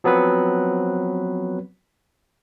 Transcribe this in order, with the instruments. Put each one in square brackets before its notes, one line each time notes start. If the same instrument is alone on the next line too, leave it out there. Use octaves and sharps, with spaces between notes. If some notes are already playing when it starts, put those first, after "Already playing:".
[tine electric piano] F3 F#3 B3 C4 B4